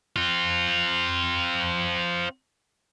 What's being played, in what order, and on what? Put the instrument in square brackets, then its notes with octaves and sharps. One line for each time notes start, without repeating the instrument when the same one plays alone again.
[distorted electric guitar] C4 F4